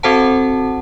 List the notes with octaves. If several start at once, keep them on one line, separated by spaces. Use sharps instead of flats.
C4 F#4 A4 C5 F#5 A5